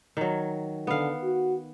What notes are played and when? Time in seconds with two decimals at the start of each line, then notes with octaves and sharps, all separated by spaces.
0.17 D#3 F#3
0.87 D3 B3 F5
1.23 F#4